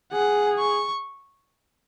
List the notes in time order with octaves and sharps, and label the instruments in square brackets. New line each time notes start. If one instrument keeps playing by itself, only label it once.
[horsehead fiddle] G#4 [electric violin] F#5
[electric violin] C#6